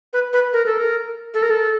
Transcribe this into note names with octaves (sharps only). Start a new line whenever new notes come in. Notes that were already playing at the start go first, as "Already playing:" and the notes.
B4
B4
A#4
A4
A#4
A4
A#4
A4